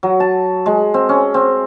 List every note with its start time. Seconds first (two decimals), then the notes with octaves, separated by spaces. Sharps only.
0.03 F#3
0.20 A5
0.66 G#3
0.94 C4
1.09 C#4
1.34 C4